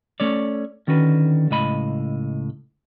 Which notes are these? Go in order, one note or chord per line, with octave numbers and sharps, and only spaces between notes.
A3 C#4 C#5 D5
D3 D#3 C#4 F#4 B4
C#2 A2 D#5 B5